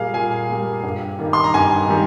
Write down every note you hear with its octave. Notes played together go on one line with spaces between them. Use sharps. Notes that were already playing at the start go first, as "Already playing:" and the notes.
Already playing: A#2 G3 A#3 G#4 F5
A#2 G#5
G3 A#3
G2
D#3 G3 A#3
C6
A#5
G2 G#5
D#3 G3